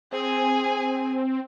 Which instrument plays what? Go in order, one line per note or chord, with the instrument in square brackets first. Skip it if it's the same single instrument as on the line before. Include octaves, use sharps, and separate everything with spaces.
[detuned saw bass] C4 [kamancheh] G#4 G#5